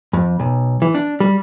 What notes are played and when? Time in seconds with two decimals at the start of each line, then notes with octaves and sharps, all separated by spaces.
0.13 F2
0.40 B1
0.82 E3
0.95 D4
1.20 G3